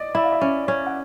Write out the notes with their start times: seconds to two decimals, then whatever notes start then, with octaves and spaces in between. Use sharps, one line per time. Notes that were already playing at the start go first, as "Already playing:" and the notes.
Already playing: D5 D#5
0.15 E4 E5
0.24 F5
0.33 E5
0.41 C#4
0.68 C#4
0.86 F#5